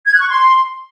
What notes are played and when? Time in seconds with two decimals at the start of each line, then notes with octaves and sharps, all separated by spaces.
0.06 G#6
0.14 F#6
0.21 C#6
0.29 C6